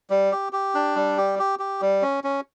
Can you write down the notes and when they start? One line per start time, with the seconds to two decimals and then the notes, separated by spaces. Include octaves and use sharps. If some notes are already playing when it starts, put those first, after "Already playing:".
0.10 G3
0.32 G4
0.53 G4
0.75 D4
0.96 G3
1.17 G4
1.39 G4
1.59 G4
1.81 G3
2.02 C#4
2.24 C#4